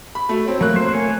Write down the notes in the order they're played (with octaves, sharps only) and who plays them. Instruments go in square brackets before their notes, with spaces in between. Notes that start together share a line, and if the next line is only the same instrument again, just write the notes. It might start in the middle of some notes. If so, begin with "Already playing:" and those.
[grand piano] B5
[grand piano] A3 [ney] F#4
[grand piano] C4 [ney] C#5
[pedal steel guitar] F#3 [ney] A3 [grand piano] A#3 F#6
[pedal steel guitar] C5
C#5 G#5